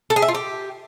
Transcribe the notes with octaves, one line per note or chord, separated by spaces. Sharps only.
A4
G#4
E5
F4
G4